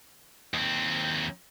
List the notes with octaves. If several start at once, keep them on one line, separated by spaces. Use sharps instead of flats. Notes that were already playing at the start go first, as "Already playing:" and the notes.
D#2 C4